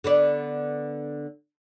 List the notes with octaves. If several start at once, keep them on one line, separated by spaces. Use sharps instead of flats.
D3 B3 D5